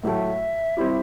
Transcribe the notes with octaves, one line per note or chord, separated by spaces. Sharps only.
A2 F#3 A3 E5
G3 C4 E4 G4